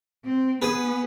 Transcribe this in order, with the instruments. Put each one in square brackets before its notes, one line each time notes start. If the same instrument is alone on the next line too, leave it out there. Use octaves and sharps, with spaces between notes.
[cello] C4
[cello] B3 [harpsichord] G#4 B4